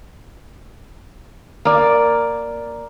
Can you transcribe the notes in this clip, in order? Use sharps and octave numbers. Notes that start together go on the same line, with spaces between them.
A#3 D5